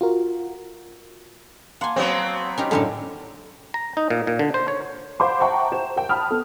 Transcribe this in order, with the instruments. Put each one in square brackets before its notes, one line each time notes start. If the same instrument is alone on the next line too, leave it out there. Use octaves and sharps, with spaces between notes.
[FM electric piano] F4 F#4 A#4
[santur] A#3 A5 C6 [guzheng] F#5 G#5
[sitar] F#3 B3 C4
[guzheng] C#4 D#4 G4 [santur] A#4
[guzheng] F#2 A2 C#4 [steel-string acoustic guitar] D3 D4 A4
[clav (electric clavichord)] A#5
D#4
A#2
A#2
D3
C5
C#5
[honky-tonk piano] C5 F5 F#5 B5 C6 D6
E5 F#5 G5 A5 A#5 C#6
C5 E7
A#4 G5
G5 A5 B5 D#6 F6
B3 A4